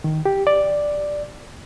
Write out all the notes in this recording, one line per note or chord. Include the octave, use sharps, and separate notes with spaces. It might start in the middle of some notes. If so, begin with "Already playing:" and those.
D#3
G4
D5